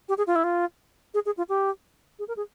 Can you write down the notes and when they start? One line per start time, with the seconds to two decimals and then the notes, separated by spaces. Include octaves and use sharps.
0.09 G4
0.18 G#4
0.27 F4
0.36 E4
0.44 F4
1.14 G#4
1.26 G#4
1.37 F4
1.49 G4
2.19 G#4
2.28 A#4
2.37 G#4